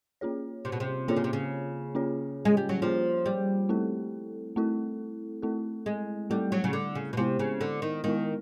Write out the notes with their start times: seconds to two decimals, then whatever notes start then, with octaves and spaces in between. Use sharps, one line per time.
0.21 A#3 C#4 F4 G#4 C#5
0.65 C3
0.72 B2
0.80 C3
1.08 D3 A#3 C#4 F4 G#4 C#5
1.16 C#3
1.24 C3
1.33 C#3
1.95 A#3 C#4 F4 G#4 C#5
2.45 G#3
2.57 G3
2.69 F#3
2.82 F3 A#3 C#4 F4 G#4 C#5
3.26 G3
3.69 A3 C4 E4 A4
4.56 A3 C4 E4 A4
5.42 A3 C4 E4 A4
5.86 G#3
6.30 G3 A3 C4 E4 A4
6.52 F#3
6.64 C#3
6.73 D3
6.95 C#3
7.13 B2
7.17 C3 G#3 B3 E4
7.39 C#3
7.61 D3
7.82 D#3
8.04 D#3 G#3 B3 E4